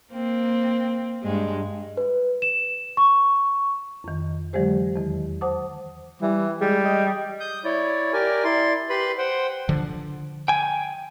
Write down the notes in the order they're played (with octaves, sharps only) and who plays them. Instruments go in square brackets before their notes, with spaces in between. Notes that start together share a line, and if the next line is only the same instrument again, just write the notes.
[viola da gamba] A#3 C4
G2 G#3
[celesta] B4
E7
C#6
[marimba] F2 D#3
D3 E3 F#3 G#3 G4 C5
E2 D#3
C5 F#5 A5 D6 D#6
[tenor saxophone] E3 [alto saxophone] G3
[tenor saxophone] G3 [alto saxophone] G#3
[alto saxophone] D#5
[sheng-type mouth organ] D#6 G6
E4 C#5 D5
G4 A#4 D5 G#5
E4 D5 C6
G4 B4 B5 C6
C5 F#5 G5
[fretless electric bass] D3 F3
[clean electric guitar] G5 G#5